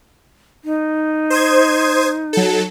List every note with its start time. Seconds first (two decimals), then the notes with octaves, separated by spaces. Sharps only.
0.64 D#4
1.30 C5 D#6 G#6
2.33 F#3 A4